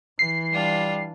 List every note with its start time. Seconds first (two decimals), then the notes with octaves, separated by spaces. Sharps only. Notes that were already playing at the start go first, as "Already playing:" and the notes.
0.19 E3 C7
0.52 G3 D4 F4